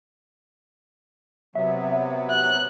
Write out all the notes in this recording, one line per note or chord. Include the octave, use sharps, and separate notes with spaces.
C3 F#3 B3 E5
F#6